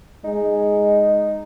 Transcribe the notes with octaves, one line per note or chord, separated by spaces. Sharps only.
G#3 D#4